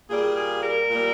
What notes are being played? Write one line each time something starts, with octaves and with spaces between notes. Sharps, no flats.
A#2 G3 A#3 G#4
G#4
A#4
A#2 G3 A#3